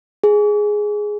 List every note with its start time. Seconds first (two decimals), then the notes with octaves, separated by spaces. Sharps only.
0.24 G#4